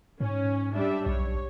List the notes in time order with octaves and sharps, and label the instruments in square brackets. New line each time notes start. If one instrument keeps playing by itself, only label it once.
[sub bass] G#2 [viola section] C#4
[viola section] G3 D4 E5
[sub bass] B1 [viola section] C#5